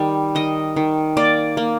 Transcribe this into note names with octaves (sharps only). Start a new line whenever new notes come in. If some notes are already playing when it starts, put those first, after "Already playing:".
Already playing: D#3 G3
D#3 D#5
D#3
A#3 D5
A#3